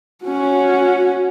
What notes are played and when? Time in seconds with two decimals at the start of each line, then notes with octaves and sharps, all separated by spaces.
0.24 C#4 F#4